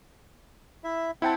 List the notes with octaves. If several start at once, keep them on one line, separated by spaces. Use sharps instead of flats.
E4 E5
C4 E4 F#5 G5 A5